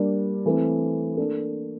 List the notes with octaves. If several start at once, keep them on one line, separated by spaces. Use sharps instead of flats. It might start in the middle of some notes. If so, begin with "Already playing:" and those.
Already playing: G3 A#3 D4
E3 A3 C4
A#3 D4 A4